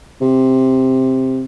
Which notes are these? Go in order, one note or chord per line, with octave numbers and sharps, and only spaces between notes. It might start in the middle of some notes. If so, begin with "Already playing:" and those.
C3